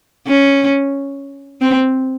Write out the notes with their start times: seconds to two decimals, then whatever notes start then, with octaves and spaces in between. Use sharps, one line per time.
0.27 C#4
1.61 C4